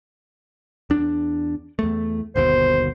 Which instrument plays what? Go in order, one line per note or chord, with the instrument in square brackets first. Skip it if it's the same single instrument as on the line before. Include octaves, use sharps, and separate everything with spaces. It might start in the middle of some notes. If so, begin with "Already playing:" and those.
[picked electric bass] E2 D4
E2 A3
[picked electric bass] G1 D#2 B2 [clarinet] C5